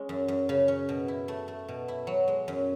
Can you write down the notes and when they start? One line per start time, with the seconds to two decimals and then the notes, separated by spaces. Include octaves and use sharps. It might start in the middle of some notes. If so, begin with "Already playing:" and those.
Already playing: G#3 C#4
0.09 F#2
0.28 F#2
0.49 C#3
0.68 C#4
0.89 B2
1.08 E4
1.28 A3
1.48 A3
1.68 B2
1.88 E4
2.07 F#3
2.28 G#3
2.48 F#2